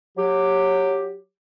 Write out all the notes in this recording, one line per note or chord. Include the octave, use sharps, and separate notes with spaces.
F#3 G4